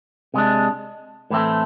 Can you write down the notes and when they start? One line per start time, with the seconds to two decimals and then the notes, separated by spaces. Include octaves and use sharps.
0.34 C3 G#3 D4
1.30 A2 E3 A3 C4